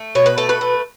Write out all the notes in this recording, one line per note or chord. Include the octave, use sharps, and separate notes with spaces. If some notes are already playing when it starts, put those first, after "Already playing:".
Already playing: A3
B2 C#5
B4
A3 A4
B4
A3